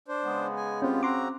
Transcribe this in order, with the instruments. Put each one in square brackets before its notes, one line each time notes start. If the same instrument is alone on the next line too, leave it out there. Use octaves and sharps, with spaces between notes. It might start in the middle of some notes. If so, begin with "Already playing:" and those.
[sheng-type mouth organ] D4 C5
[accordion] C#3 G#3 B3
[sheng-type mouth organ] G#5
[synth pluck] C4 C#4 [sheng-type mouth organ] F4 G4
[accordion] C#3 [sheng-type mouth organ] C4 F#4 A#5 [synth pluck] C6 D6